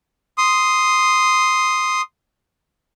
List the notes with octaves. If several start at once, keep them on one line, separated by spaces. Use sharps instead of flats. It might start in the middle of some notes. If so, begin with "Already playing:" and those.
C6 D#6